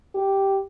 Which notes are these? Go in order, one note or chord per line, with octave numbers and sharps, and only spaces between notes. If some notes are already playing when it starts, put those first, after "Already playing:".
G4